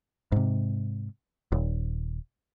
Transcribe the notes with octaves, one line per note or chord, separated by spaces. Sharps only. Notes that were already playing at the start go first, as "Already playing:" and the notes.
G#2 C3
D#1